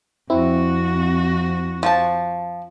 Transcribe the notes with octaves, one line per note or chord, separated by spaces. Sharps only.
F2 C4 E4 F#4
F3 A5